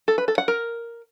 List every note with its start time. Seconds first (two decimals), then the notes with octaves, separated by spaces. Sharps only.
0.08 A4
0.18 B4
0.28 A4
0.38 F#5
0.48 A#4